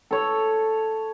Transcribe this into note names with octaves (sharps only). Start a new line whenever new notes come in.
A4 C#5